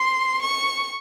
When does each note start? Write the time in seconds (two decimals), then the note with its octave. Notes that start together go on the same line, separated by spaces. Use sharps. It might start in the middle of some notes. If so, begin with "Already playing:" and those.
Already playing: C6
0.42 C#6